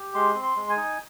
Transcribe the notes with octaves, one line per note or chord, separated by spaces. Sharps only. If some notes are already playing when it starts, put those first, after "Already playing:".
Already playing: G4
G#3 C6
C4
C6
G#3
G#5
D#4